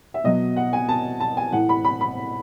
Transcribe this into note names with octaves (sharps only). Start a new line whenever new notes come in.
E5
B2 F#3 D#5
F#5
G#5
A5
A5
G#5
A2 E3 F#5
B5
B5
B5